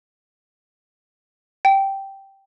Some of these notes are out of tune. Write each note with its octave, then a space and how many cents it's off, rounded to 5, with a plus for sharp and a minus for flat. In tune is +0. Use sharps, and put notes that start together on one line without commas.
G5 -5